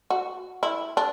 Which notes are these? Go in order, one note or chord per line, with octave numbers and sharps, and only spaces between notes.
F#4
E4
D4